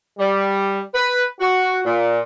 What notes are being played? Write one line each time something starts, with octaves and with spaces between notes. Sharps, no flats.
G3
B4
F#4
A#2